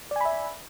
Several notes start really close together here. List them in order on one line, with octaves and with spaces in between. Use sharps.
D5 G#5 B5 E5